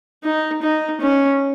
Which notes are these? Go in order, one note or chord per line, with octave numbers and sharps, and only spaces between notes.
D#4
D#4
C#4